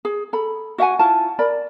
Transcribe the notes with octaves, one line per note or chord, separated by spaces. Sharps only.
G#4
A4 B5
F#4 E5 F#5 G#5
E4 F4 A5
A#4 D5 B5